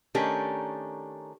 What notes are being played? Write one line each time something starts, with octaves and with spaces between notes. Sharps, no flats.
D#3 A3 C#4 D4 G4 A#4